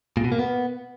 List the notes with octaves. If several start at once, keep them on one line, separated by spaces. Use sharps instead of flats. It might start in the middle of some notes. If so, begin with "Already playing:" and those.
A#2
B2
A#3
B3